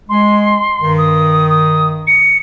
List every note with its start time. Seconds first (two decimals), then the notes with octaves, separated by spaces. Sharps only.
0.09 G#3 C6
0.80 G2 D#3
0.98 D#6
1.49 D#6
2.07 C#7